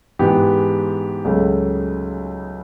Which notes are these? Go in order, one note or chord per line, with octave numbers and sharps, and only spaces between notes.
G#2 E3 G#3 B3 G4
C#2 C#3 F#3 A3